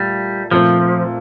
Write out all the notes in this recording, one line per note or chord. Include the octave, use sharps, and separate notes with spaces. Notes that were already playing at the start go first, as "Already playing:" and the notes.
Already playing: A#2 G3 A3
A#2 F3 A3 C4